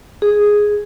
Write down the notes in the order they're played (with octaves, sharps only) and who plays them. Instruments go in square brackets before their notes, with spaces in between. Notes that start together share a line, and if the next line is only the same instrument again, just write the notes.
[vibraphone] G#4